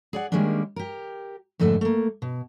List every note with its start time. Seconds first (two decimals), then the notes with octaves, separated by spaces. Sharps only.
0.13 G#4 D5 F#5
0.32 D#3 G3 G#3 A#3 C#4 D4
0.76 G4 A#4
1.59 F2 G#2 D3 A3 G4 E5
1.81 A3 A#3
2.22 B2